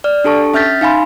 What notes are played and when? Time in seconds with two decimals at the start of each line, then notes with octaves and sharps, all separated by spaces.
0.04 D5 F6
0.24 D4 G4 A4 A5 C#6
0.54 C#4 E5 F6 G6 A6 B6
0.81 D#4 F5 G#5 B5 C6